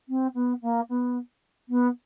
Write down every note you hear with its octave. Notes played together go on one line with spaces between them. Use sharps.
C4
B3
A#3
B3
B3